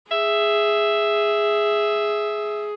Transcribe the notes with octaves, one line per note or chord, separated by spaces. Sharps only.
G#4 E5